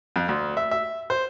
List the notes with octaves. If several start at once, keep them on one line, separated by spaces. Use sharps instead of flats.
F2
D2
E5
E5
C5